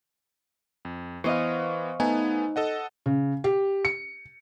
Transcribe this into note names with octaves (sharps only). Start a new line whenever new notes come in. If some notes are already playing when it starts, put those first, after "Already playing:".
F2
E3 B3 C5 D#5 F5 C#6
A3 B3 D#4 G#5
A4 D#5 F#5
C#3
G4
C#7